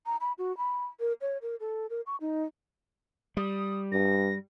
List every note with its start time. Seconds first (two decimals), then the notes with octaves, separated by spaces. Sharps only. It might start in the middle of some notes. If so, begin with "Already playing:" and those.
0.06 A#5
0.21 B5
0.38 F#4
0.57 B5
1.00 A#4
1.21 C#5
1.42 A#4
1.60 A4
1.90 A#4
2.06 C#6
2.21 D#4
3.37 G3 D#6
3.92 G2 A#6